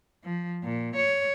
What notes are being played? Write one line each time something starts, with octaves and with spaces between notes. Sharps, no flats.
F3
A#2
C#5